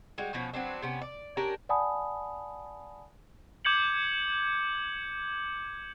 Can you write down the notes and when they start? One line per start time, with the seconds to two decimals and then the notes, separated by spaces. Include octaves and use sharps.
0.18 G3 G#3 F#4
0.33 B2 F3 C#4 F#4
0.54 F#3 B3 C4 D4
0.82 C3 B3 C#4
1.01 D5
1.37 C#4 D4 G4 A#4
1.69 D5 F#5 G#5 A5 B5 D#6
3.65 D6 G6 G#6 C#7 F#7